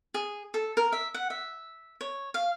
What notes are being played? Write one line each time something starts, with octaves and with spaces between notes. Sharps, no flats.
G#4
A4
A#4
E5
F#5
E5
C#5
F5